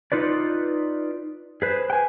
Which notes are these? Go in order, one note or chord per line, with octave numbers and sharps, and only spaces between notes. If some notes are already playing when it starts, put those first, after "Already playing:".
D#4 F4 B4 D5
G#4 B4 C5
G5 G#5